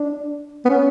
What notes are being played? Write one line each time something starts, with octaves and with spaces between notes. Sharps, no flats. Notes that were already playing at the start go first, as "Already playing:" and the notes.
Already playing: D4
B3
C#4